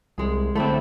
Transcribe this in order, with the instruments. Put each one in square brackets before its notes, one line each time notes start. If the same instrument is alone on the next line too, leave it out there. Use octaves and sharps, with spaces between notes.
[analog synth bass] C2 [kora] G#3 G#4
[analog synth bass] D3 [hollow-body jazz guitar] A3 C4 [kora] E4 A4